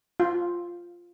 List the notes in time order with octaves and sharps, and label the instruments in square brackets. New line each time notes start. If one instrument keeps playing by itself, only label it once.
[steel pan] F4